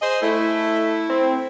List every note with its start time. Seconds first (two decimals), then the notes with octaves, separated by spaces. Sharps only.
0.02 G#4 C5 D#5
0.22 A3 E4
1.10 C4